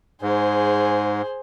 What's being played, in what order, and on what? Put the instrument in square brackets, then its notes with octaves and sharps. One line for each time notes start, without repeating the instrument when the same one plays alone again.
[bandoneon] G#2 [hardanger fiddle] G#4 C5